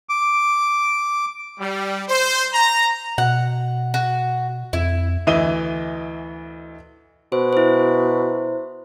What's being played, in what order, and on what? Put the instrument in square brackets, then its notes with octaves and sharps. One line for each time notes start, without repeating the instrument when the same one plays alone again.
[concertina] D6
[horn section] G3
C5
A#5
[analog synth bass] B2 [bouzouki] F#5
[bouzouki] F#4
[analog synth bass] F2 [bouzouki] E4
[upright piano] D2 E3 D#5 E5 D#7 G7
[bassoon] B2 [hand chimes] C5
[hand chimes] E4 C5